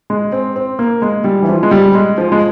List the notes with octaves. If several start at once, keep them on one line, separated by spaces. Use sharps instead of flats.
G#3
C4
C4
A#3
G#3
G3
E3
F3
G#3
G3
G#3
F3
G#3